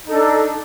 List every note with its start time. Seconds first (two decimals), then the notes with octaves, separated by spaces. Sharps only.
0.05 D#4
0.08 A4
0.11 D4